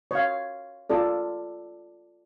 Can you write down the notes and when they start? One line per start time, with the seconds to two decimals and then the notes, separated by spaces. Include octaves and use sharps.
0.11 C#5 F5
0.90 F4 A4 D5